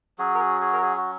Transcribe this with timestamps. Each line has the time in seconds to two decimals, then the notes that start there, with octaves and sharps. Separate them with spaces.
0.18 F#3 C#4 F#4 G#4
0.35 A#4
0.40 G#4
0.61 G#4
0.73 A#4
0.82 G#4
0.97 F#4